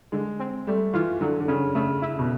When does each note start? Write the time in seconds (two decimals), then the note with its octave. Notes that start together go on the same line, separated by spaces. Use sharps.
0.12 D3 G#3
0.40 C4
0.67 G3 A3
0.94 E3 F4
1.21 D3 F#3
1.40 D3
1.48 C#3 C#4
1.75 C#3 A3
2.02 E4
2.19 B2